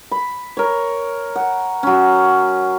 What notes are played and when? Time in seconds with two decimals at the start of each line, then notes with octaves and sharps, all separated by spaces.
0.11 B5
0.57 A#4 C#5
1.36 F#5
1.83 F#3 C#4